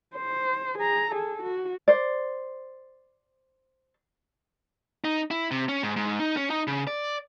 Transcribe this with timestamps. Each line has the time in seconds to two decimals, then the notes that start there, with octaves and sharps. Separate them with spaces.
0.16 C5
0.78 G#4 A#5
1.11 G#4 A4
1.42 F#4
1.88 C5 D5
5.04 D#4
5.31 E4
5.51 C3
5.68 C#4
5.83 G#2
5.96 G#2
6.20 D#4
6.37 C#4
6.50 D#4
6.67 C#3
6.87 D5